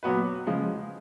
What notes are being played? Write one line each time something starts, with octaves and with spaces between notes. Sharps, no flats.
A#2 F#3 B3 F#4 B4
C#3 F3 G#3